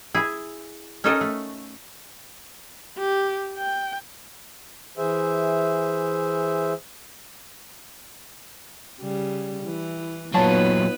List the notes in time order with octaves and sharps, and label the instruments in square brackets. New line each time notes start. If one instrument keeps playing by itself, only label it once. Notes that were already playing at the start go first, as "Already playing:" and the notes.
[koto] E4 G#4
C#4 D#4 F#4 A4 A#4 D#5
A3
[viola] G4
G5
[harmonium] E3 G#4 C5 E5
[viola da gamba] C#3 G3
[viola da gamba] E3 [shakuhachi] E4
[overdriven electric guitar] A#2 F#3 [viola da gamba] B3 D#4 B4 [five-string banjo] F4 A5 [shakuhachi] C#5